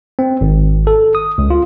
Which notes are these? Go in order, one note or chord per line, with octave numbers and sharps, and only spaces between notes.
C4
G#1
A4
D#6
C#2
F4